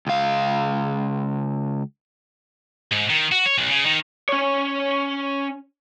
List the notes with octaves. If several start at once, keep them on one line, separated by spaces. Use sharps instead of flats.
C#2 F5
G#2
D#3
F#4
C#5
B1
C#3
D#3
C#4 C#5